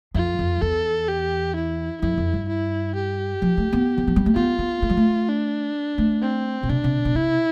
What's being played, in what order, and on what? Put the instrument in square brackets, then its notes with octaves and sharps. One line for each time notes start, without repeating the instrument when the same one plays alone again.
[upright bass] F2 [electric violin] F4
[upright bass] F2
[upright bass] E2 [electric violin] A4
[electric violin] G4
E4
[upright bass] F2 [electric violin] E4
[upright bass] F2
G2
[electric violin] E4
G4
[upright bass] F3
A3
B3
E3
F3
G3
A3
[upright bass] B3 [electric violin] F4
[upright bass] B3
A3
G3
A3
[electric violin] D4
[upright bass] A3
[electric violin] C4
[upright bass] B2
[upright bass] C3 [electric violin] D4
[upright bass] C3
B2
[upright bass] C3 [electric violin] E4